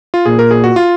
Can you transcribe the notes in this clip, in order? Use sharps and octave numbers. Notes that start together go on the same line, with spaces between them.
F4
A#2 G#4
A#4
G#4
F#4
F4